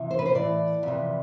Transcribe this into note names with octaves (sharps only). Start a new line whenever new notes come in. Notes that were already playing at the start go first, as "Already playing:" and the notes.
Already playing: F2 C3 E3
C5
B4
C5
A2 E3 D5
F2 C3 E3